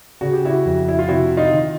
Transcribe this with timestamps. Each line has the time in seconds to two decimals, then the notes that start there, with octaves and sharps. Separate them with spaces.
0.21 C#3 F#4
0.33 G4
0.45 E4 F#4
0.65 F2
0.88 E4
0.99 F4
1.08 C3 E4 F#4
1.37 D#4 F4
1.52 D#3